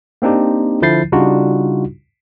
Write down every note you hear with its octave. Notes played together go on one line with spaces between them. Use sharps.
A#3 C4 D4 D#4 G4
D3 F3 E4 G6 A6 C7
C#3 G3 D4 D#4 F4 F#4